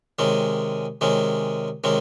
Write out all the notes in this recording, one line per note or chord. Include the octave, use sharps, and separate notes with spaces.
C3 D#3 G#3 C#4
C3 D#3 G#3 C#4
C3 D#3 G#3 C#4